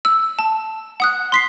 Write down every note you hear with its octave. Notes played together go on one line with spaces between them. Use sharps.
E6
A5
F#5 D#6 F#6
C6 B6 C7